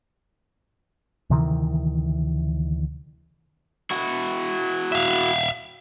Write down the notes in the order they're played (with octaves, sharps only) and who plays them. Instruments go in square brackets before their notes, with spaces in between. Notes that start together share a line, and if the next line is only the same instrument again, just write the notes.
[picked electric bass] D2 C3 D#3 E3
[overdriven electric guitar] E4 F#4
[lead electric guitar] E5 F5